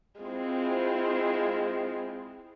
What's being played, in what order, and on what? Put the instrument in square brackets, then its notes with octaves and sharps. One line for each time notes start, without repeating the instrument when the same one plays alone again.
[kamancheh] G#3 F4 [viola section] C4 E4